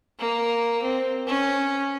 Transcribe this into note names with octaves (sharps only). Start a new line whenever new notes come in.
A#3
C4
C#4